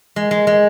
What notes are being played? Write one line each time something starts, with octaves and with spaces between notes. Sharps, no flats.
G#3
G#3
G#3